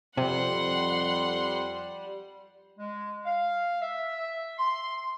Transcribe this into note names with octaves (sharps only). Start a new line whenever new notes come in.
F2 C3 G3 F#5 C6
G#3
F5
E5
C6